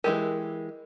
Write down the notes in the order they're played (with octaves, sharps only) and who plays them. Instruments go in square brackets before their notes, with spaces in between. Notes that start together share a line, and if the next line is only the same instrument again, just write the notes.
[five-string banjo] E3 G#3 G4 [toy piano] A#4